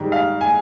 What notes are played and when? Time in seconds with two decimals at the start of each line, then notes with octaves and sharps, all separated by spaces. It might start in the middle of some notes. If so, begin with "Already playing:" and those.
Already playing: G#2 D#3 G3
0.12 F5
0.41 G#5